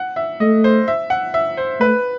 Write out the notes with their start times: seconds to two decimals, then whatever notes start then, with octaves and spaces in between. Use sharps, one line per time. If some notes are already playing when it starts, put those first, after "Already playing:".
Already playing: F#5
0.16 E5
0.40 A3 D#5
0.64 C5
0.88 E5
1.10 F#5
1.34 E5
1.57 C5
1.80 A3 B4